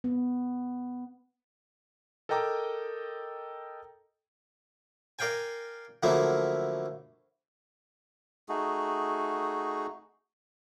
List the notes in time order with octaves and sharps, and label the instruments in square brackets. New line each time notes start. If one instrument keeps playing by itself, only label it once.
[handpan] B3
[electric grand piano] A4 A#4 D#5 G5 A#5 D6
[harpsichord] A#4 D5 F5 G5 G#5
D3 F3 F#3 A3 A#3 E4
[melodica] A3 D#4 F#4 G#4